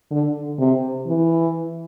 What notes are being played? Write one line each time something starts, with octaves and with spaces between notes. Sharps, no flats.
D3
C3
E3